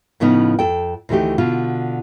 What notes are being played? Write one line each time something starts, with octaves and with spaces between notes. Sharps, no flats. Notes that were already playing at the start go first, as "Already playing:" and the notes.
A2 C#3 F3 B3 D#4
F2 A4 G5
D2 D#3 E3 A3 D#4 G4
B2 D3 F4